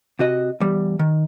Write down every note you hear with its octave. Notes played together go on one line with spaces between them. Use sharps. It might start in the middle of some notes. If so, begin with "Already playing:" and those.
C3 F#4 D#5
E2 G3
D#3